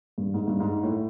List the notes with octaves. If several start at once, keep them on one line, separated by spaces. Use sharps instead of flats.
G2
G#2
G2
G#2
A2